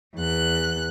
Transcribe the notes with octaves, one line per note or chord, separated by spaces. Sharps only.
E2 F#6